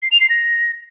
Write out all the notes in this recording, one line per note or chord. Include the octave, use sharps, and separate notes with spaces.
C7
F7
C7
A#6